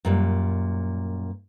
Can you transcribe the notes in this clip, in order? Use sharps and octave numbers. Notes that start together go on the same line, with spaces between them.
F#2 A#2 G3